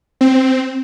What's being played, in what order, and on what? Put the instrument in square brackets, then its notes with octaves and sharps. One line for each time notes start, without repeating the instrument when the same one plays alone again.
[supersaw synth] C4